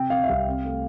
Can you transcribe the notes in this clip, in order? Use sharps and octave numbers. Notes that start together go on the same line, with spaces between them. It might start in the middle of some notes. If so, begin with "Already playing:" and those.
Already playing: C3 G5
C3 F5
E5
C2 F5
C4
A3